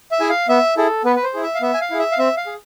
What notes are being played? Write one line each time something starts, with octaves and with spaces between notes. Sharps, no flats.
E5
E4 G#4 G#5
F5
B3 E5
E4 G#4 A4
B3 B4
B4
C5
E4 G#4
E5
F5
B3 E5
G#5
F5
E4 G#4
E5
F5
C4 E5
F5
G#4